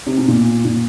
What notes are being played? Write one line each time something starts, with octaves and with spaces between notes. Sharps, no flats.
C3
B2
A#2
A#2